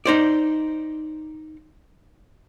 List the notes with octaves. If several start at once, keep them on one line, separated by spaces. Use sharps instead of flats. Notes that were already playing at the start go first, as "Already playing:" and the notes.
D#4 C5 D5